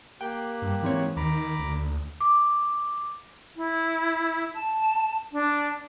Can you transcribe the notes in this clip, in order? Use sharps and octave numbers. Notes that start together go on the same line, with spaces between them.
A#3 G4 G5 F#6
G2
G#2 E3 C4 C#5
D#2 D#3 A#5 B5 D6
D2
D6
E4
A5
D4